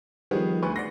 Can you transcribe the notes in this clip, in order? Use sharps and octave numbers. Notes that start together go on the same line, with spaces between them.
D#3 F3 G3 B3 G#4
D2 B4 C#6
D5 F#5 C6 A#6